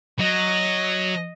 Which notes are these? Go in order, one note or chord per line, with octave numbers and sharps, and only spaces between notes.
F#3 D#5